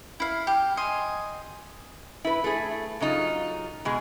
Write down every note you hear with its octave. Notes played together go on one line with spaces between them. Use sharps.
E4 F5
G4
D#5 G#5 C6
E4 B4
A3 G#4
C#3 F#3 D#4 F4
B2 G#3 G#4